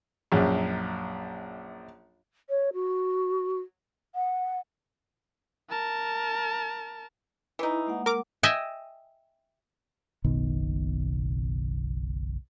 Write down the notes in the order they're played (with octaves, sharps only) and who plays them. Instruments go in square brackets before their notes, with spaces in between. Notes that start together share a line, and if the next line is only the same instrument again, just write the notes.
[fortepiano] A#1 F#2
[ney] C#5
F#4
F#5
[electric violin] A#4 A5
[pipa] E3 D#4 [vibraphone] E4
[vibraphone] G#3 A#3 F#5
[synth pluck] A#4 D6
[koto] D#5 E5 G5 G#5
[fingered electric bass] F#1 B1 B2 D#3